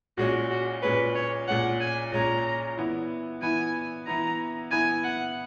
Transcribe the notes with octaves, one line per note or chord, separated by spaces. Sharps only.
A#2 G#3 C#4 F#4
F#4
A#2 G#3 C#4 B4
C#5
A#2 G#3 C#4 F#5
G#5
A#2 G#3 C#4 A#5
E3 B3 E4
E3 B3 E4 G#5
E3 B3 E4 A#5
E3 B3 E4 G#5
F#5